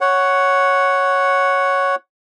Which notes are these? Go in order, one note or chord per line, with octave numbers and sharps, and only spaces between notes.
C#5 F#5